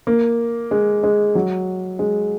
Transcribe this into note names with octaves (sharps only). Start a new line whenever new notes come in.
A#3
G#3
G#3
F#3
G#3